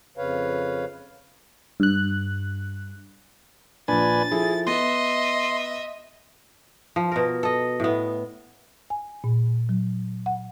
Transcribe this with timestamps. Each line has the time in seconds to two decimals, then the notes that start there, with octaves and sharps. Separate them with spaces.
0.17 F2 C#3 B4 C#5 F5
1.80 G2 F#6
3.88 A#1 A#2 D4 B4 G#5 A6
4.31 F3 E4 G#4 A4
4.67 B3 D#5 E5 C6
6.96 F3
7.12 B2 A#4
7.43 A4 D#5
7.80 A2 B3
8.90 G#5
9.24 A#2
9.69 F#3
10.26 F#5